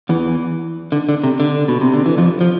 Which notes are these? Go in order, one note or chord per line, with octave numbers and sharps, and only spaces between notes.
E2 E3
D3
D3
C3
D3
B2
C3
D3
E3
F2 F3
F3